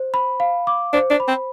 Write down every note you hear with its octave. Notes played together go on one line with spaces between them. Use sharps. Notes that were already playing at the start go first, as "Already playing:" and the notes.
Already playing: C5
B5
F5
D6
D4 C5
D4
B5
C4